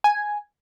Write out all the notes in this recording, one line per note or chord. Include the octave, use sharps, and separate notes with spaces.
G#5